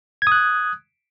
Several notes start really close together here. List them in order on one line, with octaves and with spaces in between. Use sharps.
G#6 D#6 F#6